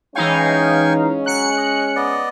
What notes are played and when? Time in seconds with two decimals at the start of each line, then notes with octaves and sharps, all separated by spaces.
0.16 E3 G#3 C#4 D#4 F5 G5 G#5 C#6
1.26 F#3 F#6 C#7
1.57 D#5
1.96 B3 D5 D#5